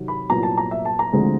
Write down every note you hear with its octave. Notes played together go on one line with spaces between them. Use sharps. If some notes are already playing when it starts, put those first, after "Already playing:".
Already playing: C3 D#3 F#3
B5
C2 A#2 F#3 B3 A#5
A5
A#5
E5
A5
A#5
D2 D3 F3 G#3 C4